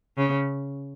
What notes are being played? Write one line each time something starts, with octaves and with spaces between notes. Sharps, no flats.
C#3